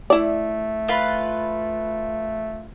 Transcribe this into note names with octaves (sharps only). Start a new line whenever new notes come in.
A3 E4 D5
F4 B4 B5